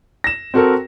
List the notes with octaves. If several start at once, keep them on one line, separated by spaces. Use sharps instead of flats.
A#6 E7
C4 F#4 A4 A#4